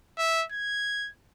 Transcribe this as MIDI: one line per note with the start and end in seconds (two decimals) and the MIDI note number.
0.18 0.44 76
0.52 1.09 92